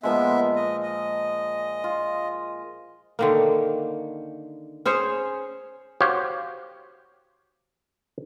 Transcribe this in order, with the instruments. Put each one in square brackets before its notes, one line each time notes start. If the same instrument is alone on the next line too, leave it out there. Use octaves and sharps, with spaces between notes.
[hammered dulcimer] A#2 F3 G#3 [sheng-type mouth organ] B3 E5
[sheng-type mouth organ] D#5
D#5
[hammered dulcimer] F4
[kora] D3 D#3 A#3
C#4 G#4 C5 C#5
[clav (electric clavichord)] F#4 G4 C5 C#5 F5 G5